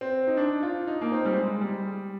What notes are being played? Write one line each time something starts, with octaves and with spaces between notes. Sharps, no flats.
C4
D#4
D4
F4
D#4
A#3
C4
G3
G#3
G3